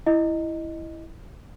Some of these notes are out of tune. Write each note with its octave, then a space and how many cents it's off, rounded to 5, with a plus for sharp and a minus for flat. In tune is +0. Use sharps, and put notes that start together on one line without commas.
E4 +0 D#5 +0